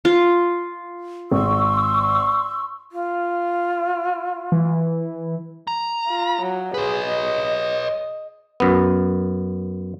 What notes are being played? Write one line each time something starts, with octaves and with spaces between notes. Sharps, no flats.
F4
G#1 C6 C#6 E6
F4
E3
A#5
F4
F#3
G#4 B4 C#5
D#5
F#2 B3